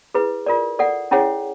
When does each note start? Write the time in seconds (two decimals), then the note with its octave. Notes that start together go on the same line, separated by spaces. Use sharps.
0.15 E4 G#4 B4
0.46 F4 A#4 D5
0.79 A4 D5 F#5
1.11 C#4 E4 G#4 C#5 F#5